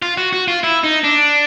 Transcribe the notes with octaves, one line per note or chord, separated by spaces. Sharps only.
F4
F#4
F#4
F4
E4
D#4
D4